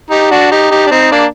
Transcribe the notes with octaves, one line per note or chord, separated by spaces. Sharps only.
D#4 G4
D4 F#4
D#4 G4
D#4 G4
D4
C4 D#4
A#3 D4